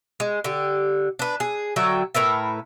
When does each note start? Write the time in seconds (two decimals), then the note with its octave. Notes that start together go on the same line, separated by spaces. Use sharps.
0.20 G#3
0.44 D3 G4
1.19 D4 B4
1.40 G#4
1.76 D3 F#3 E5 G5
2.15 A2 A#4 B4 E5